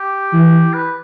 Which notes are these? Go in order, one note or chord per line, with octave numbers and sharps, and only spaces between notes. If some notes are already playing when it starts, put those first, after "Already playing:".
Already playing: G4
E3
B4